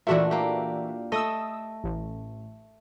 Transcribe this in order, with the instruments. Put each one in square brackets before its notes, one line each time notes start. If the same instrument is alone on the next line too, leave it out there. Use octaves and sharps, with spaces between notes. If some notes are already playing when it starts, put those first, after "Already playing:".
[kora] A#2 A3 D4 [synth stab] E3 F#4 E5
[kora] A#3 G4
[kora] A3 D#5 [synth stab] D#6 E6
[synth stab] A1